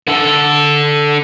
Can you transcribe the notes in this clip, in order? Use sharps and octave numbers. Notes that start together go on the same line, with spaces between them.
D3 A4